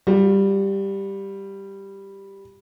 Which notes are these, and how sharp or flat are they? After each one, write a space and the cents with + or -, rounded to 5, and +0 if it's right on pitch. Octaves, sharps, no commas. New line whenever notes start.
G3 +5 F4 +45